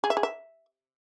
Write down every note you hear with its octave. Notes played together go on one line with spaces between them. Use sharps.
G#4
E5
G#4
E5